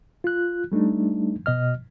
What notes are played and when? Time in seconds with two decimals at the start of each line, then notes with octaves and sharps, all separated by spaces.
0.24 F4 F#6
0.72 G3 A3 D4 D#4
1.46 B2 D#5 F6